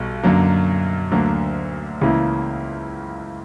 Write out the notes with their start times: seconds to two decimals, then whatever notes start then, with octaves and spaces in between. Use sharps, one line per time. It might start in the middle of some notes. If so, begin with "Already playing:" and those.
Already playing: B1 B2 G3
0.23 F#2 D3 F#3 A#3
1.12 D2 D3 F#3 A#3
2.01 C#2 C#3 E3 A#3 E4